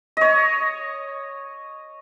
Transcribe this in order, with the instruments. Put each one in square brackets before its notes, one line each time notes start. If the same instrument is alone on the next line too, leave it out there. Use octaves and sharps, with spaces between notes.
[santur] C#5 D#5